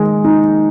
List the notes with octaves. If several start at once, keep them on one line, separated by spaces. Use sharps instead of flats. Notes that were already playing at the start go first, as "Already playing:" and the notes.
Already playing: D#3 G#3
D#4